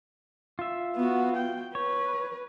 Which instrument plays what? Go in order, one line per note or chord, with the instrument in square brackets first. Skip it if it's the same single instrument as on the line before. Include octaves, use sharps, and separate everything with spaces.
[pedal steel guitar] F4 E5
[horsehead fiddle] B3 F#4
G5
[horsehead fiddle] B4 [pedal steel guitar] C#5